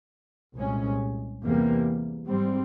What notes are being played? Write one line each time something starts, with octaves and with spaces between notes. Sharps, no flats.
C2 A#2 G#3 C#4
E2 C3 G3 A#3
G#2 G3 C4